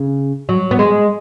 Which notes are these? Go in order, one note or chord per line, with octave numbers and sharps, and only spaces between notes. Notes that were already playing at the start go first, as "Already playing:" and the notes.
Already playing: C#3
F#3
B3
G#3